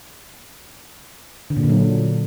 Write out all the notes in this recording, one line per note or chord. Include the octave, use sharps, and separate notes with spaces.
D3
A#2
D3
F#3